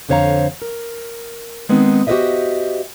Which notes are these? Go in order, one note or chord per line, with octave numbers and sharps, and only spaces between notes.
F2 D3 C5 C#5 F5 A#5
A#4
D#3 G#3 B3 C4 D#4
F#4 G4 B4 C5 D#5 E5